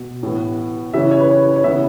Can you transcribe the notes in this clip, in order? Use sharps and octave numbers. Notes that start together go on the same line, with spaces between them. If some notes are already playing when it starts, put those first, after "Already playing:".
Already playing: B2
A2 E3 B3
C#3 E3 C#4 E5
C#5
B4
C#5
C#5
C#3 E3 B3 E5